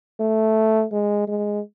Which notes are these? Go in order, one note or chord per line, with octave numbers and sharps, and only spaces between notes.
A3
G#3
G#3